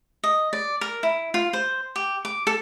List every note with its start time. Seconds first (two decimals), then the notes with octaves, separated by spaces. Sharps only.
0.24 D#5
0.53 D5
0.81 A#4
1.03 E4
1.34 F4
1.53 C5
1.96 G4
2.25 D6
2.47 A4